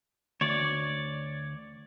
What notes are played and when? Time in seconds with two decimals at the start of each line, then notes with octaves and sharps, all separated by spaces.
0.41 D2 C#5 D5